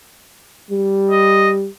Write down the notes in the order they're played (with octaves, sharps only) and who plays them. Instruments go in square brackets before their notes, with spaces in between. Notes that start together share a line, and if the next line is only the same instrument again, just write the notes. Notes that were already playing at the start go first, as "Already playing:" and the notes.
[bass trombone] G3
[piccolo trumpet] D#5